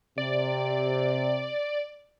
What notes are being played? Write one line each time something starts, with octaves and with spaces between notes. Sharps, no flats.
C3 D5